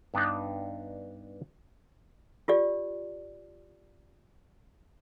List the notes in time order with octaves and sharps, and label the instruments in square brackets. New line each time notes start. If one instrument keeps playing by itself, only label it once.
[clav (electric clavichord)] G2 B3 D4 D#4
[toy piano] F4 G4 D5